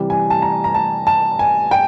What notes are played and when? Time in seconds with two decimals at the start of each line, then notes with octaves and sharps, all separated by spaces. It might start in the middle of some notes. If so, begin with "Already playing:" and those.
Already playing: C3 E3 G3
0.10 G#5
0.30 A5
0.42 A#5
0.64 A#5
0.75 A5
1.07 A5
1.39 G#5
1.71 G5